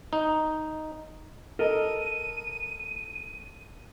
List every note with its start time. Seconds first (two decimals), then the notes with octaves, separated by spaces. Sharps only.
0.13 D#4
1.59 A4 A#4 D#5 D#7